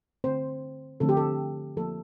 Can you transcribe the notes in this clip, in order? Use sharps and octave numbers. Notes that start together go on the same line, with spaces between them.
D3 A3 C4 C5
D3 F3 A3 C4 A4
G4
A4
F3 A#3 A4